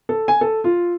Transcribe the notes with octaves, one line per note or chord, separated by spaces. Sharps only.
A4
G#5
A4
F4